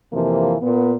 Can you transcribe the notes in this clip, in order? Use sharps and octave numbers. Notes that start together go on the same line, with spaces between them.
F2 C3 E3 F3 A#3
A#2 B3